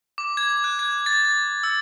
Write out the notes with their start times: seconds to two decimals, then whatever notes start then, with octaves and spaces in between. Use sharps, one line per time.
0.18 D6
0.37 G#6
0.64 F#6
0.79 G#6
1.06 A6
1.25 A6
1.63 E6